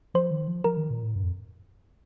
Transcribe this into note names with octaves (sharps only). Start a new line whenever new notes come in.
F3 C5
D#3
F3
F3 A#4
D#3
A#2
A2
G2
F2